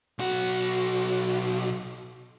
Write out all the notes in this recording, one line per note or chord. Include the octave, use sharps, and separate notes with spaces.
B1 F#4